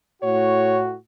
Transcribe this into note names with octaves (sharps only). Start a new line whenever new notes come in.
A2 F#4 C#5